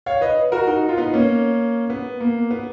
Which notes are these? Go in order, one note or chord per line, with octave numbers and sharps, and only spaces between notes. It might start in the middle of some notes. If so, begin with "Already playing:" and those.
C#5 F5
B4 D#5
F#4 A#4
D#4 F#4
F4
B3 D#4
A#3 C#4
B3
A#3
B3